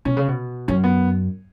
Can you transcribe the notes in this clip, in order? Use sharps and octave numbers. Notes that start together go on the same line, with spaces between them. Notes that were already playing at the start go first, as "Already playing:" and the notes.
B2 C#4
C#3
B2
F#2 C#4
B3